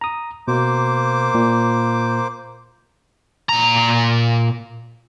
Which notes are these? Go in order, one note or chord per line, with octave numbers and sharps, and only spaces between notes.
A#5 D#6
B2 A#3 C5 D6
A#2
A#2 A#5